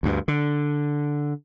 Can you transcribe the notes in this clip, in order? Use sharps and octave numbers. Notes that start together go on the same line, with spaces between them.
D2 G2
D3